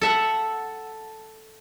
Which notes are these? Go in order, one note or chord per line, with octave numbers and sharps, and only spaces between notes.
A4 E5 F#5